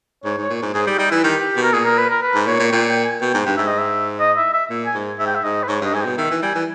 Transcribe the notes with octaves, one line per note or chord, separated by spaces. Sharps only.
G#2 C#5
G#2 C#5
A#2
G#2
G#2 G#4
G3 G4
G3 D#4
E3 E4
D#3 G4
B2
A#4
A#2 G#4
A#4
B4
A#4
B4
G#2
A#2 C#5
A#2
A#2 G5
G5
G#5
B2 G5
G#2
G2 G5
G#2 E5
D#5
E5
D#5
E5
E5
A#2
G#5
G#2
G#2 E5
G5
E5
G#2 D#5
B4
G#2 C#5
G2 D#5
G#2 G#5
B2 G5
D#3 E5
E3
G3 G#5
E3